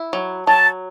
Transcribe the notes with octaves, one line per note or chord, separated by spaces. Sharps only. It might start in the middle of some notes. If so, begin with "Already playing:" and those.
Already playing: E4
F#3
F#3 A5